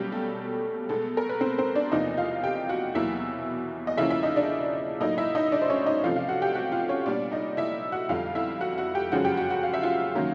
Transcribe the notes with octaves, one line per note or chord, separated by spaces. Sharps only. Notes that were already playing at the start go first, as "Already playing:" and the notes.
Already playing: B2 F#3 G3 A#3 C#4 G4
A3 A4
B2 G#3 A3 B3 A4
A#4
B4
C4 C5
C4 C5
D4 D5
E2 C3 F3 A#3 D#4 D#5
F4 F5
G4 G5
F#4 F#5
E2 B2 F#3 A#3 E4 E5
D#5
C#3 F3 A#3 C#4 E4 E5
E4 E5
D#4 D#5
D4 D5
A2 F#3 A#3 D#4 D#5
E4 E5
D#4 D#5
D4 D5
C5
C#4 C#5
D#4 D#5
C3 F3 A3 C#4 F4 F5
F4 F5
F#4 F#5
G4 G5
F#4 F#5
F4 F5
C#4 C#5
A#2 G3 B3 D4 D5
D#4 D#5
E4 E5
F#4 F#5
F2 D3 G3 F4 F5
E4 E5
F#4 F#5
F#4 F#5
G4 G5
F#2 C#3 F3 G#3 C#4 F#4 F#5
G4 G5
F#4 F#5
F#4 F#5
F5
E5
F4 F5
D#3 F#3 A#3 C#4